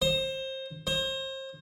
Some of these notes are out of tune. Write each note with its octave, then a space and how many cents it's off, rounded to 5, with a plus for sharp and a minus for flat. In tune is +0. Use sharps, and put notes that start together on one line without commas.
C5 +25
C5 +35